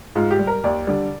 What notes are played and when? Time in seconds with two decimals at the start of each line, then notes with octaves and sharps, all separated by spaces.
0.15 G#2 F4
0.31 G4
0.39 G3
0.47 A#4
0.64 D#2 D5
0.87 D3 G3